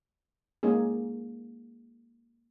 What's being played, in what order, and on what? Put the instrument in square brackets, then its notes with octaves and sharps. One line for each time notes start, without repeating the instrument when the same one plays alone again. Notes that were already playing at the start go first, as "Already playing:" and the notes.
[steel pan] G#3 A#3 C#4 D#4 G#4